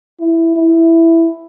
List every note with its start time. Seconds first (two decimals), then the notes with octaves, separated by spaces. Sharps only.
0.20 E4
0.56 E4